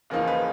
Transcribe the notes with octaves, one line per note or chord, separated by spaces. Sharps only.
E2 C#3 F3 A#3 D#4 A#4
B4